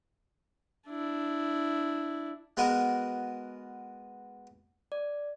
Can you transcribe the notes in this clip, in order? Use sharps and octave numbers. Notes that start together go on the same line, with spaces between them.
D4 E4
G#3 B3 F#4 A#4
D5